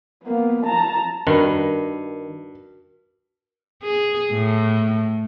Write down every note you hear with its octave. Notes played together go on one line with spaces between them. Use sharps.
A#3 B3
A5 A#5
G2 D#3 F#4 A#4 B5
G#4
A2